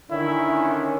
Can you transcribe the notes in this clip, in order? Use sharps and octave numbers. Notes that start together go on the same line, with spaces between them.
D3 D#3 C#4 E4